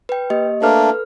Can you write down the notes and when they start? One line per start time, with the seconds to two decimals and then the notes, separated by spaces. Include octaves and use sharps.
0.09 B4 G5
0.30 A#3 G4 D#5
0.62 A3 A#3 D4 A4 B4 F6